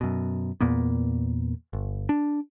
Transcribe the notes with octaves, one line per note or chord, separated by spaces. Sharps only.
F#2 B2
E2 A#2 A#3 B3
G1
D4